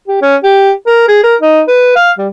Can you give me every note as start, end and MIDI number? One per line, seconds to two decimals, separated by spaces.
0.08 0.18 67
0.22 0.36 61
0.43 0.71 67
0.87 1.06 70
1.08 1.23 68
1.23 1.35 70
1.40 1.62 63
1.68 1.94 71
1.96 2.11 77
2.18 2.28 55